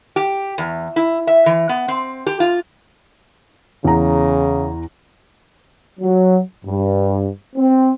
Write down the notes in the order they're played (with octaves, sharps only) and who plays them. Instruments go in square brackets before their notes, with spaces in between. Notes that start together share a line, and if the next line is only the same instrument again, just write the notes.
[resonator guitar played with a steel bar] G4
E2
E4
E5
E3
B3
C4
G4
F4
[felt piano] E2 A#5 [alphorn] C#3
[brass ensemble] F#3
G2
C4